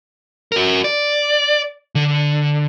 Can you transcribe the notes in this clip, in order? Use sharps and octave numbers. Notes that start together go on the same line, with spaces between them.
F#4 A#4
D5
D3